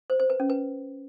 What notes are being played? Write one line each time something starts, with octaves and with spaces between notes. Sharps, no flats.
C5
C5
B4
C#4
B4